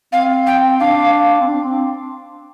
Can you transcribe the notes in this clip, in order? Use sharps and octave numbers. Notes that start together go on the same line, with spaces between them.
C4 F5
G5
D4 F5
C4
D4
C4